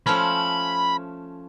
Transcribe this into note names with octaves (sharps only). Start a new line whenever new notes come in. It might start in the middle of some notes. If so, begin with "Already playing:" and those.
F3 A3 C#4 B5